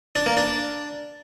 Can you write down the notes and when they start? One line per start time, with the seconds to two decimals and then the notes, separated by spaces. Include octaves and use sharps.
0.15 D4
0.26 A#3
0.37 D4